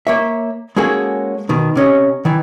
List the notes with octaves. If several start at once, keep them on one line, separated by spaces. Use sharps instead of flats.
A#3 C#5 E5
G#3 A#3 C#4 F#4 G#4 A4
B2 D#3
C3 C#4 D#5
D#3 E3